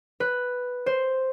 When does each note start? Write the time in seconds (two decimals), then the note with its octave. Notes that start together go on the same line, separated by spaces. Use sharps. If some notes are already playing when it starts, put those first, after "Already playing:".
0.20 B4
0.86 C5